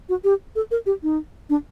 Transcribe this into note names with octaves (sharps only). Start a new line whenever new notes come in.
F#4
G4
A4
A#4
G4
D#4
D4